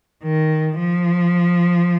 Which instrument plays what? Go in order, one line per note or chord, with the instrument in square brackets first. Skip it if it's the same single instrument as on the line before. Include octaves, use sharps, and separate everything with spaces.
[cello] D#3
F3